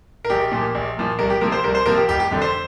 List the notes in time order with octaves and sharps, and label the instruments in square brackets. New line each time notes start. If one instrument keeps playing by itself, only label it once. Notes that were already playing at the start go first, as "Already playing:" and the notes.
[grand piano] A#4
A#1 G4
A#2 F3 A#3
A#1
A#2 F3 A#3
C2 A#4
G4
C3 F3 A#3 A#4
C5
C2 A#4
C5
C3 F3 A#3 A#4
G4
F1 G4
G4
F2 D3
C5